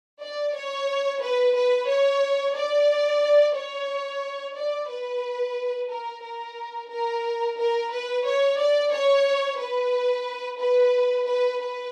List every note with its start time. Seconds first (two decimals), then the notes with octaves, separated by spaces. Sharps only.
0.21 D5
0.54 C#5
1.22 B4
1.55 B4
1.89 C#5
2.56 D5
3.55 C#5
4.56 D5
4.89 B4
5.91 A#4
6.23 A#4
6.90 A#4
7.59 A#4
7.92 B4
8.25 C#5
8.58 D5
8.92 C#5
9.59 B4
10.60 B4
11.27 B4
11.60 B4